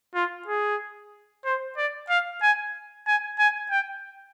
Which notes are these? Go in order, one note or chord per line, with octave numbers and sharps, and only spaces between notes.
F4
G#4
C5
D5
F5
G#5
G#5
G#5
G5